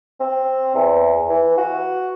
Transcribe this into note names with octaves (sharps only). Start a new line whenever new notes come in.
C4
E2
E3
F#4